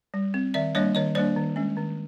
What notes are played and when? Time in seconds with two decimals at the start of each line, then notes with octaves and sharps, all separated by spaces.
0.14 G3
0.34 C4
0.54 D#3 D5 E5
0.75 G3 A#3 D4 C#5 D#5
0.95 D#3 C#5 D#5
1.15 G3 A#3 D4 C5 D5
1.36 D#3
1.56 G#3 C#4
1.77 D#3